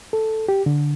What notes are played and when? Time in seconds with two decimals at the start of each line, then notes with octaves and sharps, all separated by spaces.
0.13 A4
0.49 G4
0.66 D3